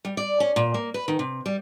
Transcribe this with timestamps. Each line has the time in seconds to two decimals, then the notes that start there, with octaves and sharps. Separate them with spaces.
0.05 G3
0.17 D5
0.40 C#4
0.56 A#2
0.74 A#3
0.94 B4
1.08 D#3
1.19 C3
1.46 G3